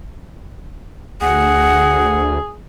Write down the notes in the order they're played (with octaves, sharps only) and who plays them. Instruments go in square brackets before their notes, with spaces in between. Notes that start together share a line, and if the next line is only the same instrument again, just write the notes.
[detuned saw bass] D2 [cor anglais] G#4 [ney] F#5